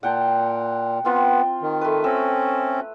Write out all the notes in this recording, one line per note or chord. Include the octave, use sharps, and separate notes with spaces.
A#2 F#5 G5 A5
B3 C4 F4
D#3
A3 B4
C4 C#4 E6